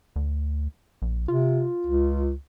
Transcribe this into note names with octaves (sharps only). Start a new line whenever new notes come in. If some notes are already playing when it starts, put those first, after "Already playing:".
D2
A#1
C3 F4
C#2